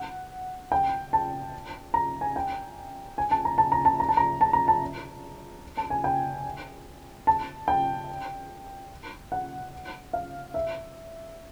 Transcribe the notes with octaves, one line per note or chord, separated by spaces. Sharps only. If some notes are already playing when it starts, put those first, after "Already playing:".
Already playing: F#5
G5
A5
A#5
G#5
G5
G#5
A5
A#5
A5
A#5
A5
A#5
A5
A#5
A5
A#5
A5
A5
G#5
G5
A5
G5
F#5
F5
E5